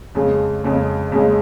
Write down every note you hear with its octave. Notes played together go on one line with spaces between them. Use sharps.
F2 C#3 G#3
F2 C#3 G#3
F2 C#3 G#3